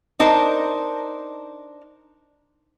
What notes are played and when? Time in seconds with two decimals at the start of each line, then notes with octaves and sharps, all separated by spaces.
0.19 D4 D#4 A#4 C5